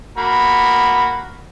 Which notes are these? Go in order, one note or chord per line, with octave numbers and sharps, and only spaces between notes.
A#3 F#4 B5